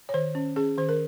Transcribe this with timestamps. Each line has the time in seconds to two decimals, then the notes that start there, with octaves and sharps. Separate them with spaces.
0.09 C#5
0.14 D#3 C5
0.35 C#4
0.56 C#4 G#4
0.78 D#3 C5
0.89 A#4